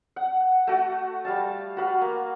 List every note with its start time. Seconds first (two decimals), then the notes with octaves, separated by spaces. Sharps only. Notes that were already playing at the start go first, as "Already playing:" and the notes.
0.16 F#5
0.67 A3 F#4
1.25 G3 F5 A5
1.77 F#4 B4 F5
2.02 A#3